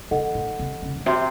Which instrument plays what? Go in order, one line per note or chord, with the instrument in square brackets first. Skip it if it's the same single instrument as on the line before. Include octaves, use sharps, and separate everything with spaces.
[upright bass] C3 [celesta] D#4 A4 D#5 F#5
[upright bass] A2
C3
C#3
A2
[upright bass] C3 [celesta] F#4 C5 E5 C6